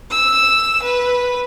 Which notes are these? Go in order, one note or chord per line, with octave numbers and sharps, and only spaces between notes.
E6
B4